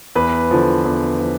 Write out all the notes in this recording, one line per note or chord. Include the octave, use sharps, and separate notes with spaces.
E2 B4
D3 F3
E2
F3